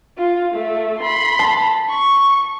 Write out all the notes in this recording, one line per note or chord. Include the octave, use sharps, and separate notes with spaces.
F4
A3
B5 C6
A5
C#6